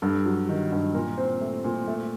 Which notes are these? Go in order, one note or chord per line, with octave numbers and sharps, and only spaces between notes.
G2 A4
F#3
D#3
G2
A#2 A#4
C4
A3
A#2
A3